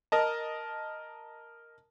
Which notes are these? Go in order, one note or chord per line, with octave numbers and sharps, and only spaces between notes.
A#4 D#5 A5